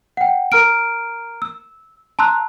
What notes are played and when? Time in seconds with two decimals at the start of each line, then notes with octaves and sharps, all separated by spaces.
0.17 F#5 G5
0.52 A#4 A#5 F6 D7
1.42 E6
2.19 A5 A#5 C6 E6 F#6